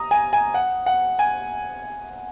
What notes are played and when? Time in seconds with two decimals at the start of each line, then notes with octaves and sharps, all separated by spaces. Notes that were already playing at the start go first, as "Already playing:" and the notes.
Already playing: A#5 D#6
0.11 G#5
0.33 G#5
0.54 F#5
0.86 F#5
1.19 G#5